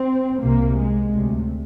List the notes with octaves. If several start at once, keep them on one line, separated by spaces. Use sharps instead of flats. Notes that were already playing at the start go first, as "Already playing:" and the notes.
Already playing: C4
C2 C3 A#3
G#3
D2 C3